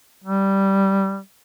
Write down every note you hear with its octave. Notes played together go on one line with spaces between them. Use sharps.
G3